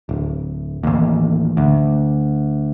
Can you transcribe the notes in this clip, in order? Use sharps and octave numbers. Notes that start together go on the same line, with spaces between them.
D1
A1 D#2
D2